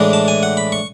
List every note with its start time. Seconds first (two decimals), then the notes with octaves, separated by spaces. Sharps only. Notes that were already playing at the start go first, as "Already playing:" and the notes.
Already playing: A2 E3 G#3 D4
0.13 A5
0.28 G#5
0.43 F#5
0.57 B5
0.72 C#6